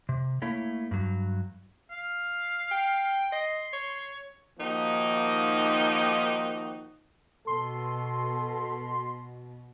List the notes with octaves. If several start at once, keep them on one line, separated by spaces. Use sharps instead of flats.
C3
A3 A#3 E4 C#5
G2 F#3
F5
G5
D#5 C6
C#5
D#3 F3 A#3 D#4 F#4 G4
B2 A4 C6